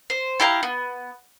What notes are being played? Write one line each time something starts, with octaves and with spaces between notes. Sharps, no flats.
C5
E4 G4 F5 A#5
B3